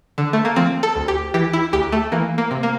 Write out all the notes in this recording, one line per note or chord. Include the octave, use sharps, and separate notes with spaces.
D3
A3
A#3
F3 C4
A4
D2
G4
E3 G4
E4
D2 G4
A3
E3 A#3
A#3
C3
A#3